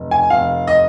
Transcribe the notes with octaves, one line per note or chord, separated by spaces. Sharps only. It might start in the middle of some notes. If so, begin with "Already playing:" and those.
Already playing: F1
G#5
F1 F5
D#5